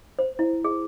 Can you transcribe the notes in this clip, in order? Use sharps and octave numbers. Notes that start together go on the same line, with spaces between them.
C5
E4
G#4